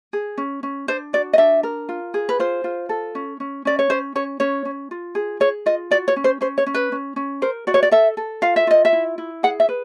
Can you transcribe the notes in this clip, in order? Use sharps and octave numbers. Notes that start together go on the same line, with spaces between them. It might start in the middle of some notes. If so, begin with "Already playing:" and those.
G#4
C#4
C#4
D4 C5
F#4 D5
D#5
D4 E5
A#4
F4
G#4
B4
F4 C5
F4
A4
C#4
C#4
C#4 D5
C#5
C#4 C5
C#4 C#5
C#4 C#5
C#4
F4
G#4
G#4 C#5
F4 D#5
F#4 D5
C#5
C#4
C5
C#4 C5
C#5
C#4
B4
C#4
C#4
A#4 C5
F#4 D5
C#5
D5
A4 E5
A4
F4 F5
E5
F4 D#5
E5
E4
E4
G#4 F#5
E5
B4